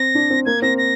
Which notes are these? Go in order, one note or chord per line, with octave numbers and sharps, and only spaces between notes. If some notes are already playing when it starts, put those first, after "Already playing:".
Already playing: C4 A#6
D4
C4
A#3 G#6
C4 A#6
A#6